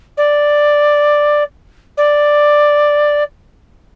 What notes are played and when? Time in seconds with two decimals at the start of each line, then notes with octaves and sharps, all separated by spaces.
0.17 D5
1.97 D5